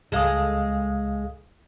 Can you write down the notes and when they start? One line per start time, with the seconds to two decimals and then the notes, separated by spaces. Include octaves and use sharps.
0.12 C#2 G#3 A4 F5 D#6